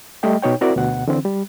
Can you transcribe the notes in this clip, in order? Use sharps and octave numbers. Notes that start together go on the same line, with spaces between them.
G3 A3 D#5 G5
B2 D#4 C#5 G5
C4 E4 F#4 A#4 D5
D2 B2 F#5
D3 E3 C4
G3